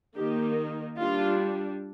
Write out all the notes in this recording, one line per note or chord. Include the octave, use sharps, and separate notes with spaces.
D#3 A#3 D#4 G4
G3 D4 F4